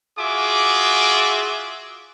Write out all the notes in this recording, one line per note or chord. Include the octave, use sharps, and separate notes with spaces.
F4 F#4 G#4 E5 D6